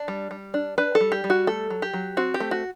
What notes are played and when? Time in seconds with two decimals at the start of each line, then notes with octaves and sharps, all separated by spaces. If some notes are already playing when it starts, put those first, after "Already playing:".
Already playing: D4
0.08 G3
0.31 G3
0.54 D4
0.78 D4 B4
0.95 A4
1.01 G3
1.12 G4
1.24 G3
1.30 F#4
1.47 A3 A4
1.70 F#3
1.82 G4
1.93 F#3
2.17 C4 F#4
2.34 G4
2.40 A3
2.51 F#4